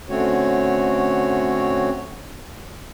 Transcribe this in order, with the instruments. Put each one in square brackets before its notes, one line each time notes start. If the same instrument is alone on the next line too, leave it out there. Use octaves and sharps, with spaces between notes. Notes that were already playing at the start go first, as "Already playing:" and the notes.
[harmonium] D3 A3 C4 C#4 F#4 C#5